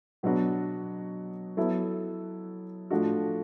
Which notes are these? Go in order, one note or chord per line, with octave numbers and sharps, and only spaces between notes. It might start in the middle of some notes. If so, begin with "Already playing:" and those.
B2 F#3 B3 D4 F#4
F#3 B3 E4 A4
A2 F3 A3 D4 F#4